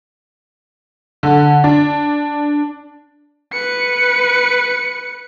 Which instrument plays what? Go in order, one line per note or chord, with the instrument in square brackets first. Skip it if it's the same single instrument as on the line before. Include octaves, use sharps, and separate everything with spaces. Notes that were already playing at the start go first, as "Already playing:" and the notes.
[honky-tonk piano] D3
D4
[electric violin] B4 C#7